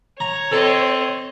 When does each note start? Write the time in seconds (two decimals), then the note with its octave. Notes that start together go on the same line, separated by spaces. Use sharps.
0.20 C#5 A#5
0.52 C4 A4 D#5